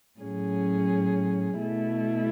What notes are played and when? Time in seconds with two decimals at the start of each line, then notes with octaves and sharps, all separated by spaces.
0.20 A2 F#3 C#4 G#4
1.58 B2 A3 E4